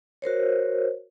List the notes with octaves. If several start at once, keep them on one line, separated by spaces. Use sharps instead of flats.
F#4 A#4 C5 C#5